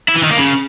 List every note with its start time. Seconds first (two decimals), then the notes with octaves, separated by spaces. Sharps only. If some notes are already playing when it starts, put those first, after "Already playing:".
0.08 E4
0.16 E3
0.23 D#3
0.30 A#3
0.38 C#3